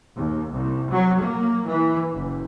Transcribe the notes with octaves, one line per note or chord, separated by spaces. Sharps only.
D#2
C2
F#3
A#3
E3
F#1